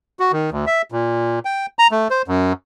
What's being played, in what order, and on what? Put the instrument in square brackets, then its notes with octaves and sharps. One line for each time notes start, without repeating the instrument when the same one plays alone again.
[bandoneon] F#4
D#3
D2
E5
A#2
G5
A#5
A3
C5
F#2